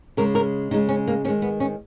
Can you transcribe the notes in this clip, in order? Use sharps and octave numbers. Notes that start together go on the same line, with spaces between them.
C#3 G#3 A#4
A#4
C#3 G#3 D#4
C#4
A#3
D#3 G#3 C#4
B3
C#4